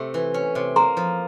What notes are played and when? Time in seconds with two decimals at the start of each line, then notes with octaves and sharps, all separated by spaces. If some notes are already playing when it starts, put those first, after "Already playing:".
Already playing: C3 A3
0.14 E3
0.34 C#4
0.55 C3
0.76 A#3 A#5 C6
0.97 F3